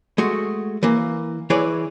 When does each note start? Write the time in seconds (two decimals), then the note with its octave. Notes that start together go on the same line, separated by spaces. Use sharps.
0.18 G#3 A3 F#4
0.83 E3 A#3
1.50 E3 E4 G#4 B4 C#5 D5